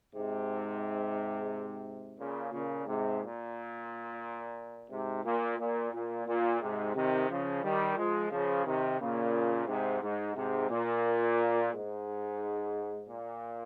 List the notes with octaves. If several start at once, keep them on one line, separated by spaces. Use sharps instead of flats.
G#2 C3
A#2 C#3
A#2 C#3
G#2 C3
A#2
G#2 C3
A#2
A#2
A#2
A#2
G#2 C3
C3 D#3
C#3 F3
D#3 G3
F3 G#3
C#3 F3
C3 D#3
A#2 C#3
G#2 C3
G#2
G#2 C3
A#2
G#2
A#2